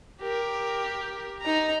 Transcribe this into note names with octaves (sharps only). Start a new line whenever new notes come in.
G4 A#4
D#4 A#5